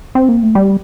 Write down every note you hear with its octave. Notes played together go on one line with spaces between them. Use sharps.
C4
A#3
A3
G3